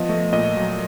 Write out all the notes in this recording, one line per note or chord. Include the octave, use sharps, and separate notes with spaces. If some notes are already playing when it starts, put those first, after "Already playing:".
Already playing: F3 B3 D#5
A3
A#2 D#5
F#3